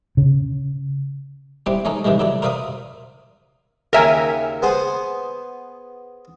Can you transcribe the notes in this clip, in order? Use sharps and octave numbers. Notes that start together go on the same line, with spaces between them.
C#3
G3 C4 E4 G4
G#3 C#4 D#4 A4
C3 D#3 E3 G3 G#3
F#3 E4 A4 D5
A#4 C5 D5 E5 F5 D#6
D#2 C#3 A#4 E5 G#5
B3 G#4 C5